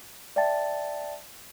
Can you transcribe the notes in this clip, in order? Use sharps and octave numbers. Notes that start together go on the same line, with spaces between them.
D5 E5 G5 A5 A6